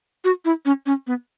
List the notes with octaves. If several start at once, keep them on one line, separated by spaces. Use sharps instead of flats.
F#4
E4
C#4
C#4
B3